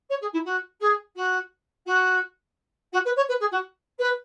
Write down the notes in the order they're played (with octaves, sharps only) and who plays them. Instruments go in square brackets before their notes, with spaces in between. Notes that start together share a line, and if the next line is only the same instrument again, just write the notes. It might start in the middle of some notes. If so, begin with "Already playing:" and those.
[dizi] C#5
G#4
E4
F#4
G#4
F#4
F#4
F#4
B4
C#5
B4
G#4
F#4
B4